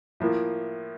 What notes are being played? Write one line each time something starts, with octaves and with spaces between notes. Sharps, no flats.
A2 F3 A#3